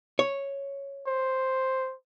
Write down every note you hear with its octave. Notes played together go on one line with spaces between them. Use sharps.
C#5
C5